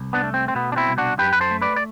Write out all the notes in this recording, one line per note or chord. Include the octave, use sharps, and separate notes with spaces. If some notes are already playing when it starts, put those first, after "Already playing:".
Already playing: C2
B3 D4
A3
C4
C4
B2 B3
D4
C4 E4
C2
D4 F#4
F#2 G4 B4
B4
A4 C5
A3
B4 D5
D5